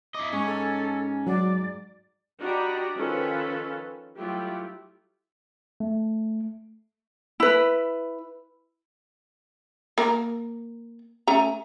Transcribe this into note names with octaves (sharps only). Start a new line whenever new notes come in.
E4 D#5 D6
G#2 C#4 C#6
A4
F#3 F#4 D5
D4 F#4 G4 D#5 A#5 B5
D#3 F3 C#4 F4 A4 B4
F#3 G3 A3 E4 F4 G4
A3
E4 B4
A#3 A#4
A3 C#4 A#5